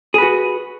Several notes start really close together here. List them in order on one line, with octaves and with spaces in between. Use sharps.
G#4 B4 F#4